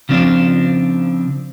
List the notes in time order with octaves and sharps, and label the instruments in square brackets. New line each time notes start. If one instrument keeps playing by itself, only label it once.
[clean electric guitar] C#3 F3 C4 D4